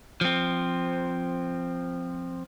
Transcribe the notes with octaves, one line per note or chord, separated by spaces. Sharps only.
F3 C4